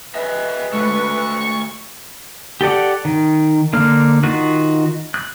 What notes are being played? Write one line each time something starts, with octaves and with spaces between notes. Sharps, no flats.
G#4 B4 D#5 E5
G#3 A3 F#4 A4 A5 C#6
G4 A4 D5 F#5
D#3
D3 A#3 F6
D#3 F4 F#4 F#6
F#6